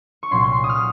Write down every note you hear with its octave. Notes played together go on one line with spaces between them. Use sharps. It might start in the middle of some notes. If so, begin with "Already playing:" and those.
C#6
C2 A#2 F#3 C#4 C6
C6
C#6
D#6
F6